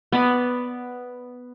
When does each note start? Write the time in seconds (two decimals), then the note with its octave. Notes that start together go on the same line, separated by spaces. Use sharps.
0.12 B3 D5 B5